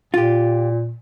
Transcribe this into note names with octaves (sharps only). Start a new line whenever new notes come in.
A#2 F4 G4